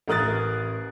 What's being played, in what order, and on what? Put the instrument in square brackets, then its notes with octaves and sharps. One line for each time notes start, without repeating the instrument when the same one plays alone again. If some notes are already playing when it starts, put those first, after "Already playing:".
[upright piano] A1 A#4 D#6 F#6 A6